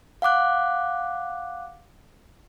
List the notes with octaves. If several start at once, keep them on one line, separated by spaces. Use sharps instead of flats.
F5 F#5 D6 F#6